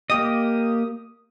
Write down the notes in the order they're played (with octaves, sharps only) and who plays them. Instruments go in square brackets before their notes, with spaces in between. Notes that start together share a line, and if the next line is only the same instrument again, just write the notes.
[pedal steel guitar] A#3 G4 D#5 [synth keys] D#6